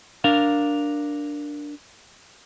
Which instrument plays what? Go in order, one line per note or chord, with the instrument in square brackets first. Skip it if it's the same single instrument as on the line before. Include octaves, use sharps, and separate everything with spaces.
[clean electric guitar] D4 A#4 F5